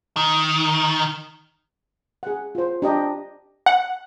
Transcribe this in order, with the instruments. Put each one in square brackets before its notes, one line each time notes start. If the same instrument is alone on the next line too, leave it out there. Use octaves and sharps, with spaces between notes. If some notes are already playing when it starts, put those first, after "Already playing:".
[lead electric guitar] D#3
[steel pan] G#4 F#5
F4 C5
D4 G4 D#5 A#5
[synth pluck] F#5